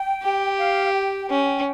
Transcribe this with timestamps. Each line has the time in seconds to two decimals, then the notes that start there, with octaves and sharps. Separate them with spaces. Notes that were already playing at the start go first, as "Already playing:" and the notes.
Already playing: G5
0.22 G4
0.58 F5
0.94 G5
1.30 C#4 G5